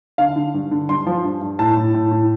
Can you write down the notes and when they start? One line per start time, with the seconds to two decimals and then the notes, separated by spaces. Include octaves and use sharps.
0.18 D3 F5
0.36 D3
0.54 G2
0.71 D3
0.89 G2 C6
1.07 F3
1.24 G2
1.41 G2
1.59 A2 A5
1.77 A2
1.94 A2
2.11 A2